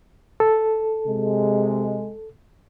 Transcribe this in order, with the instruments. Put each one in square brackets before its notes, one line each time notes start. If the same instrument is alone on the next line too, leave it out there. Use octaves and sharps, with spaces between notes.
[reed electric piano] A4
[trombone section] C3 G#3